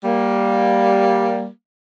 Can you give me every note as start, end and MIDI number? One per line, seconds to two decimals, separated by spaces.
0.05 1.49 55
0.05 1.49 58